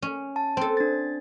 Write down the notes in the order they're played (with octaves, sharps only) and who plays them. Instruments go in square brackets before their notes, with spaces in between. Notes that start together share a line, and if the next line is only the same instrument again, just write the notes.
[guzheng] C#4
[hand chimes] A5
[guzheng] C4 A4 [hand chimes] C5
[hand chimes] D4 A6